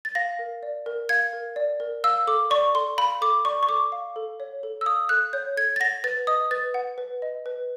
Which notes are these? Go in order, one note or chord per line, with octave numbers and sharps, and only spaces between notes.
A6
F5 A#6
A#4
D5
A#4
F5 G#6
A#4
D5
A#4
F5 E6
A4 D6
D5 C#6
A4 C6
F5 B5
A4 D6
D5 C#6
C#6
A4 D6
F5
A4
C#5
A4
E6
F5 D#6
A4 F#6
C#5 G6
A4 G#6
A6
F#5 A#6
B4 A6
D#5 D#6
B4 A6
F#5
B4
D#5
B4